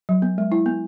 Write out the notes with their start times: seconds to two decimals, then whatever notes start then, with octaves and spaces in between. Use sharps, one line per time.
0.09 F#3
0.22 B3
0.38 G#3
0.52 E4
0.66 B3